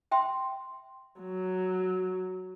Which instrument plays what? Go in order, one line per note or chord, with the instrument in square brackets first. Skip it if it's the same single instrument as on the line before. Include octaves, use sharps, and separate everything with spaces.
[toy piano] E5 G5 C6
[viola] F#3